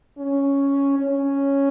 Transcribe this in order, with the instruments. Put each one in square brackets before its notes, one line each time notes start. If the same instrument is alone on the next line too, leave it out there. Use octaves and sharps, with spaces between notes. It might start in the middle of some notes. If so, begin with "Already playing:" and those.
[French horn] C#4
C#4